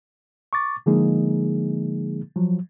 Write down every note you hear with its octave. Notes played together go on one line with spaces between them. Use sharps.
C#6 D6 A6
D3 F3 G#3 A#3 D#4 G#4
F3 F#3